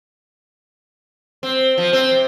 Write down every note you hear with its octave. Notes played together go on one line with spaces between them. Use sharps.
C4
F3
C4
C3